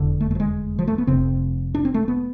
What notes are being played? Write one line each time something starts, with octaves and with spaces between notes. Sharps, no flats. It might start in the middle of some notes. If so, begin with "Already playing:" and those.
Already playing: F1 E2 D3
A3
A3
F3
G#3
F3
A3
B3
F1 F2 C3 C4
D4
C4
A3
B3